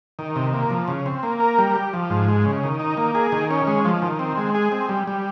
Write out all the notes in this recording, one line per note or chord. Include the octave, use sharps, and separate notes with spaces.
D#3
C3
A#3
F3
C#3
C4
A#3
A#4
G3
G4
F3
G#2
G#3
C#3
D#3
D#4
A#3
G#4
D#3
C#4
G#3
F3
D#3
C4
G#3
G#4
C4
G3
G3